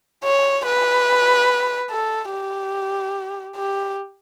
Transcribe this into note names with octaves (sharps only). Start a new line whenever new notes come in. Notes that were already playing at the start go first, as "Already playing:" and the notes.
C#5
B4
A4
G4
G4